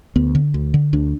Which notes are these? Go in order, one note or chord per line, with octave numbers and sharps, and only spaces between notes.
D2 B3
D3
D2
D3
D2 D4